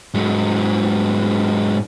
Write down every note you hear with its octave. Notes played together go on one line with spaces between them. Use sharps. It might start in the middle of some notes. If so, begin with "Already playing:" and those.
G#2 F#3